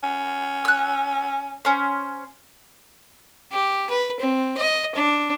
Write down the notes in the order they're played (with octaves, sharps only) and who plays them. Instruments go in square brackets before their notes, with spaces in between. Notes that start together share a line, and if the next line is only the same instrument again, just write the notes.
[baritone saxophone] C#4
[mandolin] E6 F#6
C#4 C5
[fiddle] G4
B4
C4
D#5
D4